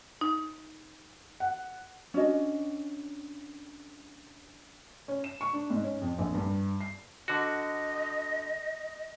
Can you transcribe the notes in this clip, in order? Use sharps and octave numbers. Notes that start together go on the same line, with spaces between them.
D#4
F#5
C#4 D4 F#4 D#5
C#4
E7
C#6
D4
G#2
C#4
F2
A#1
G2
C7
D3 F#4 D#5